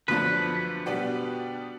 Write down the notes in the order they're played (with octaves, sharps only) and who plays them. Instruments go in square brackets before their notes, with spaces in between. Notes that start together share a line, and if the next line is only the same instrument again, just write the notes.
[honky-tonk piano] F#2 D3 F3 A3 D4 [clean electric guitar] B4
[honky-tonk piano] B2 G3 B3 D4 G4